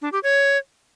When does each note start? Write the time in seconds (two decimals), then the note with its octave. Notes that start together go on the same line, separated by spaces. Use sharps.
0.02 D4
0.13 G4
0.23 C#5